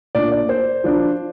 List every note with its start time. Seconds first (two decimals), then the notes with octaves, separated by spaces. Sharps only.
0.15 A#2 A#3 D4 D5
0.32 D5
0.49 C5
0.84 F3 D4